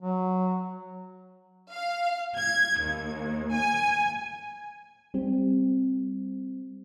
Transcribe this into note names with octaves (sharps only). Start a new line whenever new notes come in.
F#3
F5
G#6
D#2
G#5
G3 C4